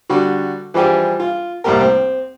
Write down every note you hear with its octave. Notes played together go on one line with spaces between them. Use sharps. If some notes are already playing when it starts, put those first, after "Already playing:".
D3 G3 F#4
E3 F3 G3 G4 G#4
F4
C2 A2 G3 A#3 G4 A#4
C4